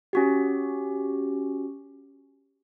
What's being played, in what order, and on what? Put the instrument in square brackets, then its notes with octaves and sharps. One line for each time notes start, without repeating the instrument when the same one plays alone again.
[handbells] C#4 F#4 G4